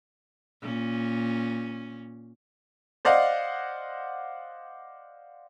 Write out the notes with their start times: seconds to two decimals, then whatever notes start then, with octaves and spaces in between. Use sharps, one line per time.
0.62 A#2 C#4
3.05 C5 D5 D#5 F5 F#5